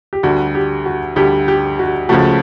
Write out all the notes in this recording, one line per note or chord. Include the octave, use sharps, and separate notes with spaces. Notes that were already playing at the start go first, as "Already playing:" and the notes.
G4
D2 D3 G3 F#4
G4
F#4
D2 D3 G3 G4
G4
F#4
C#2 C#3 F3 A3 F#4